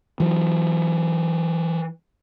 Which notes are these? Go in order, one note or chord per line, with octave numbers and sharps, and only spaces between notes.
E3 F#3